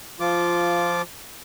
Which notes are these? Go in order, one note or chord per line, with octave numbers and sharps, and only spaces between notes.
F3 F4 D6